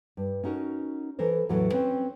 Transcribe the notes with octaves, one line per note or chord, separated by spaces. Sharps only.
G2
C#4 D#4 F#4 A#4
E3 A4 A#4 C5
E2 A2 E3 F#3 A4 F#5
C4 C#4 B4